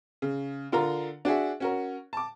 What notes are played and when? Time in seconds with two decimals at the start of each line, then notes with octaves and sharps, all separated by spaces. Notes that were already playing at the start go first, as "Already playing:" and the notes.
0.22 C#3
0.72 D3 F4 A#4 A#5
1.25 D4 F#4 G#4 E5
1.60 C#4 F#4 A#4
2.13 A5 D6